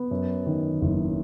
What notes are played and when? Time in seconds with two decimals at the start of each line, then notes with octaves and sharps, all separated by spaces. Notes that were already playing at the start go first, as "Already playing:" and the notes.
Already playing: B3
0.11 F#2
0.46 D#3
0.82 F#1